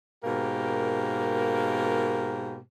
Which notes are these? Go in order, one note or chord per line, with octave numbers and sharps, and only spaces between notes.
G#2 B2 A#3 G4 A#4